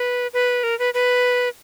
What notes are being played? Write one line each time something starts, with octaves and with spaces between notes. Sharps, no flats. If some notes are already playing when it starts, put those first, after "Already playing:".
Already playing: B4
B4
A#4
B4
B4